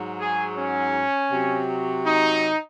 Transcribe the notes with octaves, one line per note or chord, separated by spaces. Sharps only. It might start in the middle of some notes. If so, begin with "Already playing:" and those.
Already playing: G#2 F#3
G#4
C#4
C3 F#3
D#4